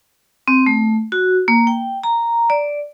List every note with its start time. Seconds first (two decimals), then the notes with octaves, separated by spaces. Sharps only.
0.48 C4
0.66 A3
1.12 F#4
1.48 A#3
1.67 G5
2.04 A#5
2.50 D5